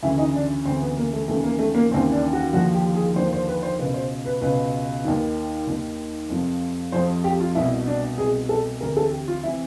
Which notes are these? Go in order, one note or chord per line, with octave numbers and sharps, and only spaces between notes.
D2 C#3 E3 E4
D#4
D4
D2 C#3 E3 C4
B3
A#3
A3
D#2 C#3 E3 A3
A#3
A3
A#3
D#2 C#3 E3 C4
D4
F#4
D#2 D3 F3 F#4
G4
G#4
D#2 D3 F3 C5
C5
B4
C5
C#2 B2 B4
C5
B4
C#2 B2 B4
D#2 D#3
D#2 D#3
F2 C3 F3
F2 C3 F3 C5
G4
F4
C2 B2 E4
D4
C2 B2 G#4
A4
D2 C3 E3 A#4
A4
G4
F4
C3 E3 E4